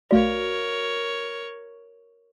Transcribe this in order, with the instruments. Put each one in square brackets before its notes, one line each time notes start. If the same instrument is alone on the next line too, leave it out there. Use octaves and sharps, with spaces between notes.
[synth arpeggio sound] B1 A3 D5 [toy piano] F#4 F5 [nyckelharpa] A#4 C#5